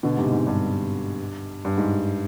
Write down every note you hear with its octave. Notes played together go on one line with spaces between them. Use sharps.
B2 D3
G#2 C3
G#2
G2
G2
G#2